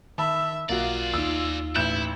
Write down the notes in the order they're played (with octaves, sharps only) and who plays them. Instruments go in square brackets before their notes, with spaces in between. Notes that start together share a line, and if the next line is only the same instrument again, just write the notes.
[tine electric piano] D#3 [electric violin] E5 [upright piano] A5 B5
[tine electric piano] B1 [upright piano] A#3 F#4 [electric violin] F4 [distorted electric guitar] G#4 D5
[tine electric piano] D#2 D#4 [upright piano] E6
[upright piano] A1 G6 E7 [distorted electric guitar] E4